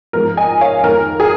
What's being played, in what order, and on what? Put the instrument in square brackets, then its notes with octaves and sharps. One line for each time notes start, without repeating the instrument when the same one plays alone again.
[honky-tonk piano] G#2 F3 G#3 A#4
D#5 G#5
C#5 F5
F2 D#3 G#3 A#4
G#4